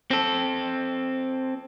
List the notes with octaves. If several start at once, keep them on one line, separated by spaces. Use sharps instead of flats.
C4 A4